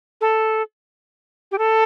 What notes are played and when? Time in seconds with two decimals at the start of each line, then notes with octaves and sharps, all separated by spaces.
0.21 A4
1.52 G4
1.58 A4